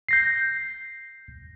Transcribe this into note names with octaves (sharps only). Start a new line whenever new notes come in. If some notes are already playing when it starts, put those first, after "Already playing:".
G6 A#6 C7